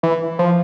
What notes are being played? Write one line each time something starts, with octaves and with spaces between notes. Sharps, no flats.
E3
F3